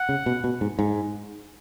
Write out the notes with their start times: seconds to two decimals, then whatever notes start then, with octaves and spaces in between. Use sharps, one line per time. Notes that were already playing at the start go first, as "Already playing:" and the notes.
Already playing: F#5
0.09 C#3
0.26 B2
0.44 B2
0.61 G#2
0.79 G#2